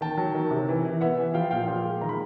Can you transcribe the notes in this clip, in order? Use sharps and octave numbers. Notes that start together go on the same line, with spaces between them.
D#3 G5 A5
F#3
D#3
C3
E3
E3
B3 E5 F#5
E3
F3 F5 G5
A#2 F5 G5
A#2 F5 G5
G#3
D#3 A#5
B5